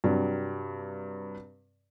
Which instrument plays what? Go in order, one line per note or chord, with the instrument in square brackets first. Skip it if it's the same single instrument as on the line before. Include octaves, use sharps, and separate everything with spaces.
[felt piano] G2 C3 F#3 G3